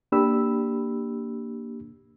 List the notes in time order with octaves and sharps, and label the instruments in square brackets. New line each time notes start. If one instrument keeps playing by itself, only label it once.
[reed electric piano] A#3 D4 G4 B5 E6